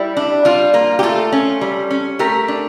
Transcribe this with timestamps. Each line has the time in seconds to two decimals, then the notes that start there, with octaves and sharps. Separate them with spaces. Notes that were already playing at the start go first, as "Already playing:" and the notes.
Already playing: G3 E4
0.17 D4
0.45 G3 F4
0.74 A#3 F4
0.99 G4
1.03 A3 F4 A4
1.32 C#4
1.61 G3
1.90 C#4
2.19 A3 G4 A#4
2.48 D4